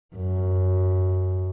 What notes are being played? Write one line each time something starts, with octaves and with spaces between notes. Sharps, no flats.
F#2